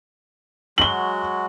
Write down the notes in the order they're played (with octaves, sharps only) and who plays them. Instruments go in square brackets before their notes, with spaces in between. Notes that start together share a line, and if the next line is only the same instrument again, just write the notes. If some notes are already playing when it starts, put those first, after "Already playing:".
[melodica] F#3 G#3 F#4 [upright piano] F#7 G7